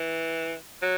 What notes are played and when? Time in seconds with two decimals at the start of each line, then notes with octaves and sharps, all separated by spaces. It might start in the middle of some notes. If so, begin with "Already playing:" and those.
Already playing: E3
0.82 F#3